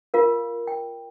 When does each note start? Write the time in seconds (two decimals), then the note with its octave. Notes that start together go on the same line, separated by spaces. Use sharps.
0.14 F4 A#4 F5
0.67 G5